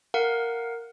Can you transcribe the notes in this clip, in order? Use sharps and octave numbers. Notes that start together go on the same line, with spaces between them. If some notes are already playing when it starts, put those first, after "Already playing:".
A#4 F5 F#5